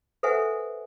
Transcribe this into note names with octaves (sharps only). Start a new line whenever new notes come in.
A4 B4 C5 E5 F#5 G#5